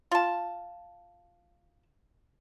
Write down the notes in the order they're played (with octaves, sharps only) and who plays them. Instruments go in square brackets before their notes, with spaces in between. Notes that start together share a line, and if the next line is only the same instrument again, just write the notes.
[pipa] F4 A5